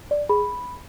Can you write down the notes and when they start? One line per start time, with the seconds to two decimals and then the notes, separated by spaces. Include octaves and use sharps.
0.11 D5
0.29 G#4 B5